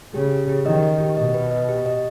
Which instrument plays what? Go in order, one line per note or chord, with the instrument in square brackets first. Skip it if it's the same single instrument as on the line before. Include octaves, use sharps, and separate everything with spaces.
[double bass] C#3 [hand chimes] G4
[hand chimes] G4
G4
[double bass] D#3 [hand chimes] D#5
[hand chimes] D#5
G4
[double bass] B2 [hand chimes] D#5
[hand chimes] B4
D#5
G4
D#5